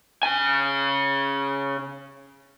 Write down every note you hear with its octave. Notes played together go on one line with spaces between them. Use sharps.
C#3 G#5